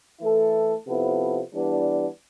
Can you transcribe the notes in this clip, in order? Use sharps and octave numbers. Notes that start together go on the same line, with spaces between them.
E3 A3 E4 A4
C3 F3 B3 E4 A4
E3 G3 B3 D4